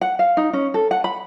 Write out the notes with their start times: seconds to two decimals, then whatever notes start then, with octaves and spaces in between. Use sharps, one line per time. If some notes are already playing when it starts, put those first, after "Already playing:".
0.01 F#5
0.19 F5
0.37 D#4
0.53 C#4
0.74 A4
0.91 F#5
1.04 B5